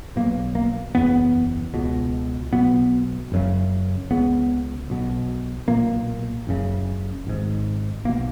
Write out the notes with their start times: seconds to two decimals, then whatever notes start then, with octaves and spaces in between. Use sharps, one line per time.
0.16 B1 B2 A#3
0.55 A#3
0.95 F#1 E2 C#3 B3
1.74 C#2 B2
2.53 B1 B2 B3
3.32 F#1 F#2 C#3
4.11 C#2 C#3 B3
4.90 B1 B2
5.68 B1 A#2 A#3
6.47 F#1 F#2 C#3
7.27 G#1 G#2
8.05 B1 A#3
8.09 B2